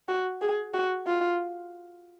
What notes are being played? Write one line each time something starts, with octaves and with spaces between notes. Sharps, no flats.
F#4
G#4
F#4
F4